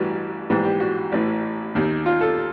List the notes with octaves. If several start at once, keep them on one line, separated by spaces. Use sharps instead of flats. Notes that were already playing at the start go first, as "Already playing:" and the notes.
Already playing: A1 G2 E3 F#4
A#1 G#2 E3 G4
G4
F#4
A1 A2 E3
D#2 D#3
F4
A4